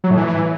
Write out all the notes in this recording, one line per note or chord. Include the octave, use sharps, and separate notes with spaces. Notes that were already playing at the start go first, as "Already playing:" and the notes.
F#3
A2
E3